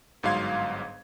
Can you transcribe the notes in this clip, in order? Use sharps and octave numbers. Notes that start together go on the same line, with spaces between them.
G1 G#2 F#3 F5 C6 G#6